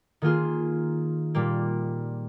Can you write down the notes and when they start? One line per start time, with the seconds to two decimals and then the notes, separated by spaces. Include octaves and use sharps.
0.22 D#3 A#3 F4 G#4
1.35 A#2 G3 A#3